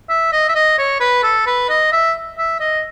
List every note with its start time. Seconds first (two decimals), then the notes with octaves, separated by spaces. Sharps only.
0.09 E5
0.32 D#5
0.48 E5
0.55 D#5
0.78 C#5
1.00 B4
1.23 A4
1.47 B4
1.69 D#5
1.92 E5
2.38 E5
2.60 D#5